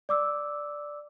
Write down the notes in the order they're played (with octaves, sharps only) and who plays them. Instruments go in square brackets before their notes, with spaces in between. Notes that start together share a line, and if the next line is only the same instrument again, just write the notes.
[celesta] D5 D6 E6